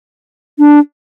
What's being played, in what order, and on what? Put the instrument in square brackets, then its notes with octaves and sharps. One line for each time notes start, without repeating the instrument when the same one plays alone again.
[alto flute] D4